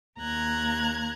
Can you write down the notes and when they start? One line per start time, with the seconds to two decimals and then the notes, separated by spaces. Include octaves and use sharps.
0.19 D#2 A#5 F#6 G#6